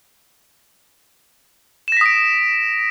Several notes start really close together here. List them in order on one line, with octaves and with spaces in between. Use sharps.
E7 A#6 B6 D#6 D7